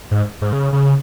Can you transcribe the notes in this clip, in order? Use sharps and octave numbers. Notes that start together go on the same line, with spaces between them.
G#2
G#2
C#3
C#3